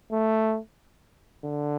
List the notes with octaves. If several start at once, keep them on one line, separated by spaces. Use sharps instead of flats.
A3
D3